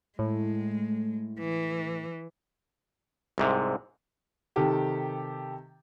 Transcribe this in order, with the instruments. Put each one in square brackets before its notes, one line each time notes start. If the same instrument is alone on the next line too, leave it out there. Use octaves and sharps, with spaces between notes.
[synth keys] A2 [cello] G#3
[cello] E3
[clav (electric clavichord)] C2 G#2 C3
[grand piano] C3 D#3 G4 A4